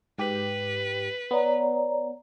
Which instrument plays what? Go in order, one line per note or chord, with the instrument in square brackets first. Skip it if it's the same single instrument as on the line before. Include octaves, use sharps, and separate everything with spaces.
[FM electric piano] G#2 G4 [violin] B4
[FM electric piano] B3 [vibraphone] C#5 D5 A#5